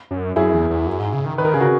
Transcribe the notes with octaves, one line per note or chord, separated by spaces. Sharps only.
F#2
F#2 E4 G#4
E2
E2
F#2
G#2
C#3
D#3
D#3 B4
A#4
C#3 G#4
F#4 A#4